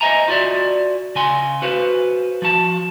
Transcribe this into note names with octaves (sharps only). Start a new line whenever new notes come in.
C5 D#5 E5 G#5 A#5
F4 F#4 D5 E5
C#3 G#5 C6
F#4 B4 C5 F5
F3 F#4 A5